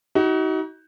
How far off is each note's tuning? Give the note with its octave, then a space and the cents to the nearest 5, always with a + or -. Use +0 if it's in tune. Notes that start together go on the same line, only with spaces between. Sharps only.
D#4 +35 F#4 +30